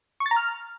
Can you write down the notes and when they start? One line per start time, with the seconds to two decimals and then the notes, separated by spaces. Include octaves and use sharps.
0.20 C#6
0.26 A6
0.31 A#5
0.36 F6